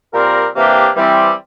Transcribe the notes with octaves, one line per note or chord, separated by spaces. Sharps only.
A#2 G3 C4 G4 A#4
C3 E3 A#3 D4 G4
E3 G3 C4